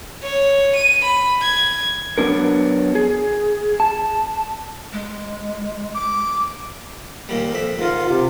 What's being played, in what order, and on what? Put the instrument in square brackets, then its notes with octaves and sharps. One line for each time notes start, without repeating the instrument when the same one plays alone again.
[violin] C#5
D#7
B5
G#6
[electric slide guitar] F#3 B3 D4 A#4
G#4
A5
[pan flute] G#3
[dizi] D6
[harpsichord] D#2 A#2 G3
F2 E5
[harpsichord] G#2 D#3 [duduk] F4
[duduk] C3